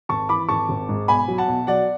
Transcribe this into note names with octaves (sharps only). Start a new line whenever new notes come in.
G#1 A5 C#6
E3 B5 D6
G#1 A5 C#6
G#1
G#2
B1 G#5 B5
F#3
F#5 A5
B1
F#3 D5 F#5